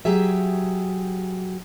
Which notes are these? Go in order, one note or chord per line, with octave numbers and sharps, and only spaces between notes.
F#3 G4 G#4 E5